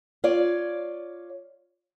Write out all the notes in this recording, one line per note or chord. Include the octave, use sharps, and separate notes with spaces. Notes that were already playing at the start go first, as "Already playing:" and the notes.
F4 C#5 D5